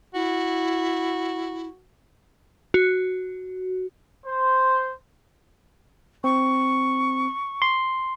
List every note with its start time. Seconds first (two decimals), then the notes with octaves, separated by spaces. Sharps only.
0.15 E4 F#4
2.74 F#4
4.25 C5
6.24 C4 C#6
7.62 C6